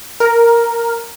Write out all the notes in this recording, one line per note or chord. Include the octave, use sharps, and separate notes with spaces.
A#4